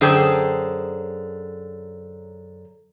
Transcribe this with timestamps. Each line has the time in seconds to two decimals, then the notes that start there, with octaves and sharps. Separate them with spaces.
0.01 F#2 D3 G#4 C5 G5 A5